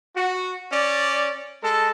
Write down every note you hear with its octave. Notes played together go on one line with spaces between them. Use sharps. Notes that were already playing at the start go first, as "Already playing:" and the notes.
F#4
C#4 D5
G#3 A4